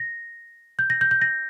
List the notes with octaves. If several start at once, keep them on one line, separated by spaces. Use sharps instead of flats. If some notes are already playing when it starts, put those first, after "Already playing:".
Already playing: A#6
G6
A#6
G6
G6
A#6